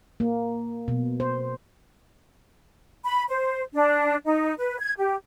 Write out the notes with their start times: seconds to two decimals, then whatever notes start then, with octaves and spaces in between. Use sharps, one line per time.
0.20 A#3
0.88 B2
1.20 C5
3.05 B5
3.29 C5
3.74 D4
4.25 D#4
4.58 B4
4.80 G#6
4.98 G4